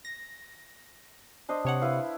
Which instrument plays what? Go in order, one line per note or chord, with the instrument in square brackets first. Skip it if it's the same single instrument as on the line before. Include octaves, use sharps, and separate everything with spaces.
[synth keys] A#6
[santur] D4 C5 D#5
[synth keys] C3 C#5 F#5
[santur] E4 B4 F5